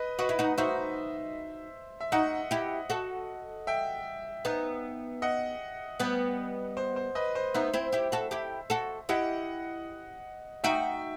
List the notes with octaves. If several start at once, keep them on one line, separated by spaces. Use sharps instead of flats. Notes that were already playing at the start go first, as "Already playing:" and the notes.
Already playing: B4 D#5
F#4 B4 D#5
E4
D#4 F#4
D#4 F#4 C5 E5
E5
D#4 F#4 D#5 F#5
E4 G4
F#4 A4
E5 G5
B3 D#4
D#5 F#5
G3 B3
C5
C5
B4 D#5
C5
B3 D#4 C5 E5
C4 E4
E4 G4
F#4 A4
E4 G4
F#4 A4
E4 G4 D#5 F#5
D#4 F#4 E5 G5